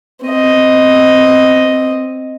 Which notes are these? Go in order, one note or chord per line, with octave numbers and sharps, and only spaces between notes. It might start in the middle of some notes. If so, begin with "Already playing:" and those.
C4 D#5